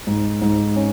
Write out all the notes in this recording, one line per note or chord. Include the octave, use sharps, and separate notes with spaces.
G#2
G#2
C#4